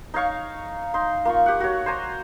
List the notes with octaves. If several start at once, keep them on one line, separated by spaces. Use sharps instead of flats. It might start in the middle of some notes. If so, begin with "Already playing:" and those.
D#4 C#5 F5 C#6
D#4 C6
A#3 F4 C#6
G4 F#5
F#4 C#5
C5 D5 G#5 A#5